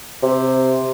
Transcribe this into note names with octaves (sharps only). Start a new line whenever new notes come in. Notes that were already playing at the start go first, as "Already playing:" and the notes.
C3